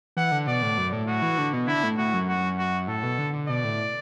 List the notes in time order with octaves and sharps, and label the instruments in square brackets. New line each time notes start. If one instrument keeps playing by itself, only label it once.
[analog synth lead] E3 [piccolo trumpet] F#5
[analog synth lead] D3
[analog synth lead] B2 [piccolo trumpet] D5
[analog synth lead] A2
F#2
A2
[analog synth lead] A2 [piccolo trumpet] F#4
[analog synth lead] E3
D3
B2
[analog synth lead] D3 [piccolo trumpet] E4
[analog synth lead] A2
[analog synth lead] A2 [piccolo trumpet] F#4
[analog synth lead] F#2
[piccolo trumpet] F#4
F#4
[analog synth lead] A2 [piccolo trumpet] A4
[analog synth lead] B2
D3
D3
[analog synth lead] B2 [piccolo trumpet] D5
[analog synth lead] A2